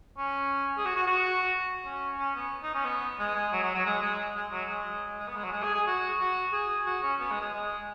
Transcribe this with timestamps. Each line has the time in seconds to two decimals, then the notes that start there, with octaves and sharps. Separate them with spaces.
0.18 C#4
0.78 G#4
0.85 F#4
0.96 F#4
1.07 F#4
1.85 C#4
2.19 C#4
2.35 B3
2.63 D#4
2.75 C#4
2.85 B3
3.19 G#3
3.35 G#3
3.53 F#3
3.63 F#3
3.74 F#3
3.86 G#3
4.02 G#3
4.35 G#3
4.52 F#3
4.68 G#3
5.20 G#3
5.28 B3
5.36 G#3
5.44 F#3
5.53 G#3
5.63 G#4
5.74 G#4
5.87 F#4
6.20 F#4
6.53 G#4
6.86 F#4
7.03 C#4
7.20 B3
7.31 G#3
7.41 G#3
7.53 G#3